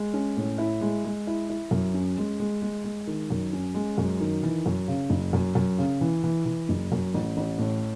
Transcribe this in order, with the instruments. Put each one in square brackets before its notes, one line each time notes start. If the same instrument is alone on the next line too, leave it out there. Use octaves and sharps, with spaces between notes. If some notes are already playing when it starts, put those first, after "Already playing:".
Already playing: [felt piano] G#3
C#4
A2
E4
G#3
G#3
E4
E4
F#2
C#4
G#3
G#3
G#3
G#3
D#3
F#2
C#4
G#3
F#2
D#3
E3
F#2
C#3
F#1
F#2
F#2
C#3
E3
E3
E3
F#1
F#2
A1
A1
A2